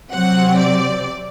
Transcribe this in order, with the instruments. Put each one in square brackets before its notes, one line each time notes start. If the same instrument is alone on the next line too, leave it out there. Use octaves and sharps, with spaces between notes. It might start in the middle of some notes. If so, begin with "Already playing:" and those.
[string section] C3 F#3 C4 F#5
D5